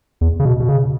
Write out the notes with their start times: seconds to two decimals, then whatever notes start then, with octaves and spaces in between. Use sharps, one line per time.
0.21 E2
0.40 C#3
0.45 B2
0.60 B2
0.69 C#3